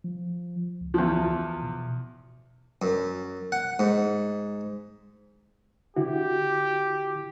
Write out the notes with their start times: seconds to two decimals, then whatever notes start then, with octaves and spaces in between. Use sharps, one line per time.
0.04 F3
0.81 C#2
0.94 E2 F3
1.62 B2
2.82 F#2
3.52 F#5
3.79 G#2
5.96 D3 E4 F#4 G4